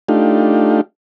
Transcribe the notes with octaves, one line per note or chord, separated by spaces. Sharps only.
A3 D4 D#4 F4 G4